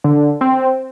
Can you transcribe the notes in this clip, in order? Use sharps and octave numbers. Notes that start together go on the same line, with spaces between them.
D3
C4